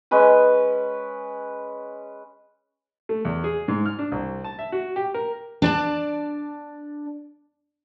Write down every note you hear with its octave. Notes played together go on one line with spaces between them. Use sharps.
G#3 C#4 B4 G#5
A3
E2
G#4
G#2
F6
D4
C2
A5
E5
F#4
G4
A#4
D4 D5 A5